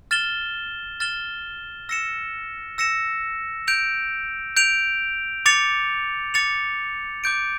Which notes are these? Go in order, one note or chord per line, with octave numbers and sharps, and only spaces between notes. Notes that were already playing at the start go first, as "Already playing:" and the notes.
F6 A6 E7 G7
F6 A6 E7 G7
E6 A#6 C#7 E7
E6 A#6 C#7 E7
G6 D7 F7
G6 D7 F7
D6 A6 C#7 F7
D6 A6 C#7 F7
D6 G6 D7